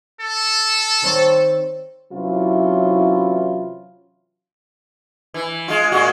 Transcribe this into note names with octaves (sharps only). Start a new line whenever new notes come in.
A4
D#3 C4 C#5
C3 E3 F#3 C#4 E4 F4
E3
G#3 F4
A#2 G#3 F#4